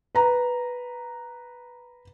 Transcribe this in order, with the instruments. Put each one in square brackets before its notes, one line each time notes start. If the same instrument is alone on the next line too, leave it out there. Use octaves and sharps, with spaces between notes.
[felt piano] B4 A#5